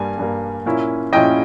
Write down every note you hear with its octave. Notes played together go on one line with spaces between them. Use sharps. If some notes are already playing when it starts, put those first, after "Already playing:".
Already playing: G2 G3 A#3 G#5
G2 G3 A#3
A#2 A#3 C#4 E4
A#2 A#3 C#4 E4 D#5 G5